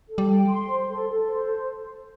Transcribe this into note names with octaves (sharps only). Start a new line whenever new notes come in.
A4
G3
G5
C6
C5
A4
A4
C5